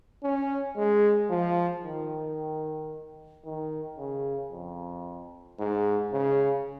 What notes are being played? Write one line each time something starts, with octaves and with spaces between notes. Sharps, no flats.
C#4
G#3
F3
D#3
D#3
C#3
F2
G#2
C#3